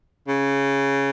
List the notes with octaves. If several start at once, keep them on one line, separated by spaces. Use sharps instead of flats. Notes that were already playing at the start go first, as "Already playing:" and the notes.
C#3